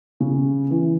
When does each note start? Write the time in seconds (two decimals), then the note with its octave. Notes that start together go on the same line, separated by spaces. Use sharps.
0.20 C#3
0.71 E3